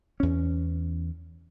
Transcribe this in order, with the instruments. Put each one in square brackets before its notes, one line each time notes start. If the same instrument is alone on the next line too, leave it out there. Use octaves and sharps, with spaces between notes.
[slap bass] E2 C#4